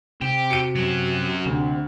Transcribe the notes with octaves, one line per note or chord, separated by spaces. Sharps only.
C3 G4
F#4 C#7 D7
F#3 C#4
D2 C3